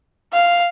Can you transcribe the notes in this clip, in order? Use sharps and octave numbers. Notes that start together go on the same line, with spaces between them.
F5